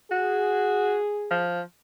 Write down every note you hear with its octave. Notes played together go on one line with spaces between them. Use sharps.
F#4 G#4
F3